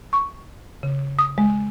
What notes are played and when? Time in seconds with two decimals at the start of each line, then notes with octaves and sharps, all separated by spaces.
0.13 C#6
0.83 C#3
1.19 D#6
1.38 G#3